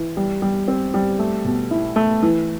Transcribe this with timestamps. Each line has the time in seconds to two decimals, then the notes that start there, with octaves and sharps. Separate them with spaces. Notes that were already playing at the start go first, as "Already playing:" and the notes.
Already playing: E3
0.17 G3
0.42 G3
0.68 C4
0.94 G3
1.19 A3
1.45 B2
1.71 E4
1.96 A3
2.23 E3